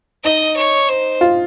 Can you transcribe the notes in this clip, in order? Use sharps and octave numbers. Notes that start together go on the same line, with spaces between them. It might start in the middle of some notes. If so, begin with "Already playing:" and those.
D#4 D#5
C#5
C5
F4